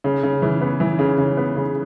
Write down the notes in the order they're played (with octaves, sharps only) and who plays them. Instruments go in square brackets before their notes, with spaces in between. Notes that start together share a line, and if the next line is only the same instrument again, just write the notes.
[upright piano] C#3
C#3
E3
B3
E3
C#3
C#3
B3
C#3